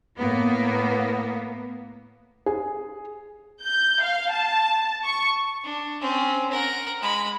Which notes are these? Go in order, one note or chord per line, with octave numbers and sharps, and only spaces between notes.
A2 A#3 B3
G#4
G6
F5
A5
C#6
D4
C4 C#4
A#4 F#5
G#3 B5